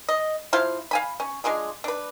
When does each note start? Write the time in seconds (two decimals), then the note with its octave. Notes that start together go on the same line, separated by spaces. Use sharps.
0.09 D#5
0.53 F3 E4 C5 F5
0.91 F5 G#5 B5
1.20 C#4
1.44 G#3 D4 F4 G#4
1.84 D4 B4